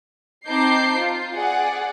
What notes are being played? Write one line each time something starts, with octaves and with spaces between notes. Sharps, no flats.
C4 D#4 A5 D6 G6 C7
F4
G#4 D5 F#5